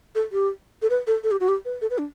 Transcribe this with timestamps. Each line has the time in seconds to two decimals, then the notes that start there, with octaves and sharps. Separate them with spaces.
0.15 A4
0.32 G4
0.82 A4
0.90 B4
1.07 A4
1.24 A4
1.31 G4
1.40 F#4
1.48 G4
1.65 B4
1.82 A4
1.90 B4
1.98 D4